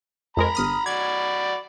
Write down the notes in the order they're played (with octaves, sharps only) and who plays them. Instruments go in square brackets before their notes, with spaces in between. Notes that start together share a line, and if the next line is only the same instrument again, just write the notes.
[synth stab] F2 G#3 A#4 [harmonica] A#5 B5
[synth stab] G1 D#6 F6
[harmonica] F#4 D5 B5 [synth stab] G#6